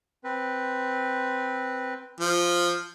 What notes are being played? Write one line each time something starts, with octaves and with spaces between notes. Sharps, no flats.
C4 B4
F3